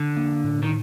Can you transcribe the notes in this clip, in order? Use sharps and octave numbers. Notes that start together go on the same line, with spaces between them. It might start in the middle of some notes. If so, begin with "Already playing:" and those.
Already playing: D3 D4
A#3
A2
D#3